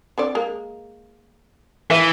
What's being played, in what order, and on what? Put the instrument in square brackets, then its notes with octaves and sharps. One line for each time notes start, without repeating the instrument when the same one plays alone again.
[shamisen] D3 C4 D5
G#3 A#3
[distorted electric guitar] E3 [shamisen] B4 E5